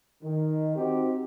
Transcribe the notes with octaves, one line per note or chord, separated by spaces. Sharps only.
D#3
C4 D#4 F#4 G4 C5